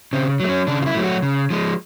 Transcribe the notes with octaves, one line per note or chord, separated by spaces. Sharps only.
C#3 C4
F#3 A3
C#4
C#3 D4
F4
E4
F#3 A3
F#4
C#3
F3 G#3